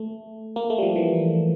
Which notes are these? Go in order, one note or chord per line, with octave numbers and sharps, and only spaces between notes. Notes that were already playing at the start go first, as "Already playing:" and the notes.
Already playing: A3
A#3
A3
G3
F3
E3